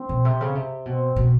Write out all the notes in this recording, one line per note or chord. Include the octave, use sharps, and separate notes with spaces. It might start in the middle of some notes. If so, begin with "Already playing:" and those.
Already playing: C4
B2
C3
C#3
C3
B2 C4
B2